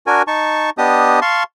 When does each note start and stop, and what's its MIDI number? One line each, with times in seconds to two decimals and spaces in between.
0.07 0.22 62
0.07 0.22 66
0.07 0.22 70
0.07 0.22 80
0.27 0.70 63
0.27 0.70 81
0.27 0.70 85
0.78 1.20 59
0.78 1.20 62
0.78 1.20 67
0.78 1.20 75
0.78 1.20 87
1.22 1.43 77
1.22 1.43 81
1.22 1.43 84
1.22 1.43 85